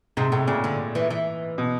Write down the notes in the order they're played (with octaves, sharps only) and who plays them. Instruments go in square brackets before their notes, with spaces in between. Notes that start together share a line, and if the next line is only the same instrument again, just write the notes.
[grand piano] G#2 [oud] C3
[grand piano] A2 [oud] C3
[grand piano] A#2 [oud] C#3
[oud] D3
E3
E3
[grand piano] B2